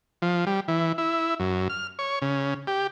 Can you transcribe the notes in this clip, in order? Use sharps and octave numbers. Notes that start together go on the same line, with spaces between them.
F3
G3
E3
E4
F#2
F6
C#5
C#3
G4